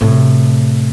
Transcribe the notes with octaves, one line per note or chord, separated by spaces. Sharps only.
A2 C3